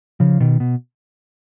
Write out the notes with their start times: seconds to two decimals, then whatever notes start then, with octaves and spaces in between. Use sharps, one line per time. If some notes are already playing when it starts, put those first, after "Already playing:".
0.20 C#3 F3
0.40 B2 D#3
0.60 B2